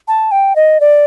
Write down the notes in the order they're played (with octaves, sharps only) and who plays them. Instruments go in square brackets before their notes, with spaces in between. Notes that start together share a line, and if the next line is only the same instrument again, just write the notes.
[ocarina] A5
G5
D#5
D5